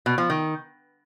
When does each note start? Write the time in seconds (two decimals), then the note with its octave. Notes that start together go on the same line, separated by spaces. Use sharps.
0.06 B2
0.18 F3
0.30 D#3